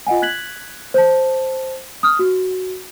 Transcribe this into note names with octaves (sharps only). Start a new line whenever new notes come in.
F4 D#5 F#5 G#5
F#6 G#6 B6 F#7
C5 A5
D#6 F6
F#4